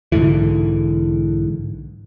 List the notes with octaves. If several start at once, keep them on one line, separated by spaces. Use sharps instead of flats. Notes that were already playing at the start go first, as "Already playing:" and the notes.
B1 G#2 D3 E3